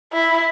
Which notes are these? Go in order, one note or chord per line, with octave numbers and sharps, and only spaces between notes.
E4